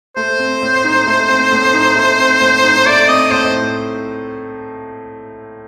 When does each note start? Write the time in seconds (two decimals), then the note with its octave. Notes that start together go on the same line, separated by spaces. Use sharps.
0.16 A3 C5
0.39 C4
0.62 A2
0.84 D#4
1.07 A3
1.29 C4
1.52 A2
1.73 D#4
1.96 A3
2.18 C4
2.41 A2
2.64 D#4
2.86 A3 D5
3.08 C4 D#5
3.31 A2 C5